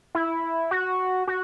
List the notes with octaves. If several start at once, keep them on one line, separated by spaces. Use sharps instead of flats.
E4
F#4
F#4